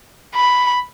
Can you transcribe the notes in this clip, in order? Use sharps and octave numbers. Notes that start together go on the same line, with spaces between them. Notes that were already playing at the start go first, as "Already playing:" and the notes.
B5